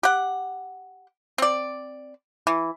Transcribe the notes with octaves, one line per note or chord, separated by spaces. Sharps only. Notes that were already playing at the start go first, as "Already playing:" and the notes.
G4 F#5
C4 D5
E3